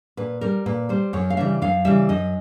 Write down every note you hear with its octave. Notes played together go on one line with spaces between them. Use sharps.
A#2 B4
G3 A#4
A#2 B4
G3 C5
F#2 C#5
F5
C#3 E3 G3 E5
F#2 F5
C#3 E3 G3 E5
F#2 D#5